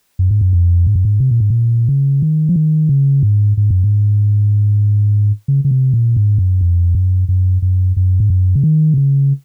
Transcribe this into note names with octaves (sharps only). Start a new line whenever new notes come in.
F#2
G#2
F#2
F2
G#2
F#2
G#2
C3
A#2
G#2
A#2
C#3
D#3
F3
D#3
C#3
G#2
G#2
F#2
G#2
C#3
C#3
C3
A#2
G#2
F#2
F2
F#2
F#2
F#2
F#2
G#2
F#2
C#3
D#3
C3
C#3